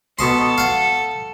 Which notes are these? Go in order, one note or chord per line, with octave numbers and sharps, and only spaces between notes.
B2 A4 D#5 C6
F5 F#5